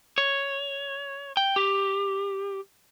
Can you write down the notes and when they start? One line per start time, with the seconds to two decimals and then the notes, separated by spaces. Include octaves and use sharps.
0.18 C#5
1.37 G5
1.56 G4